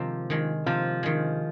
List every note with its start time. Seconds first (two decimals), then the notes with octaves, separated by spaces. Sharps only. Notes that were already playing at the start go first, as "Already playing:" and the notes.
Already playing: C3 D#3 F3 G#3
0.30 D#3 G#3
0.66 C3 F3
1.03 D#3 G#3